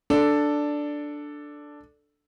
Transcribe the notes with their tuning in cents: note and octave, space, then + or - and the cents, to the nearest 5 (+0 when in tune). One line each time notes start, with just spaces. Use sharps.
D4 +0 A4 +0 D5 +0